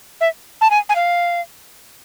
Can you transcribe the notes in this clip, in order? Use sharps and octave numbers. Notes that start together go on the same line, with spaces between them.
E5
A5
G#5
G#5
F5